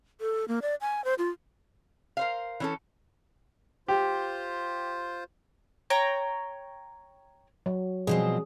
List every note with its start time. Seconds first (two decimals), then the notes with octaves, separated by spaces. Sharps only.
0.21 A4
0.48 A#3
0.62 D5
0.81 G#5
1.05 C5
1.18 F4
2.17 A#4 C5 F5
2.60 E3 C#4 A4
3.88 F4 G4 C5
5.90 C#5 G5 A#5
7.66 F#3
8.07 B2 F3 G3 C4 G#4